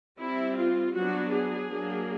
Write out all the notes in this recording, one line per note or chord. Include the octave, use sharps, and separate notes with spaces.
G3 C4 E4
F4
F#3 B3 D4 F#4
G#4
F#3 A#3 D4